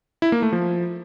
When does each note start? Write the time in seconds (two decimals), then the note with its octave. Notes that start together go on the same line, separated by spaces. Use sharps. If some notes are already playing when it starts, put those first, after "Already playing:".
0.22 E4
0.32 A#3
0.42 A3
0.52 F3